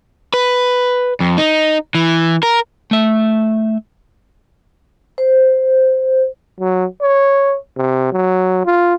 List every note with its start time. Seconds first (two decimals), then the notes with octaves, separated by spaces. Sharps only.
0.34 B4
1.20 F2
1.38 D#4
1.95 E3
2.43 A#4
2.91 A3 E5
5.18 C5
6.60 F#3
7.02 C#5
7.77 C3
8.12 F#3
8.65 F4